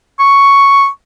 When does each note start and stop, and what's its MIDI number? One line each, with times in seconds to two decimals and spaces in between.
0.19 0.88 85